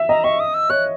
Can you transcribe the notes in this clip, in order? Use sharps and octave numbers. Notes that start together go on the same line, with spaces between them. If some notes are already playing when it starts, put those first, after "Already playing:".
Already playing: E5
D#5 A#5
D#5 C#6
D#6
E6
C#5 F#6